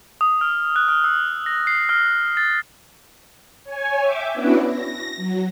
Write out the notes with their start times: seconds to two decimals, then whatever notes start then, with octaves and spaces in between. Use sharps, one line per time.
0.21 D#6
0.41 F6
0.76 F#6
0.89 F6
1.04 E6
1.46 A#6
1.67 C7
1.89 F6
2.37 A6
3.64 C#5 G#5
4.01 E5 G5 D6
4.33 B3 C#4 D4 E4 F#4 B4
4.66 A#6
5.16 F#3